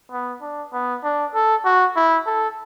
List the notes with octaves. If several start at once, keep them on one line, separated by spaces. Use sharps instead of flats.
B3
D4
B3
D4
A4
F#4
E4
A4